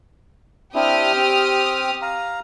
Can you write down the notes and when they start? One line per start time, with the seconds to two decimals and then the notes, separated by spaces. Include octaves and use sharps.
0.75 C4 D4 E4 G4 D#6 F6
1.15 C4
2.02 F5 A#5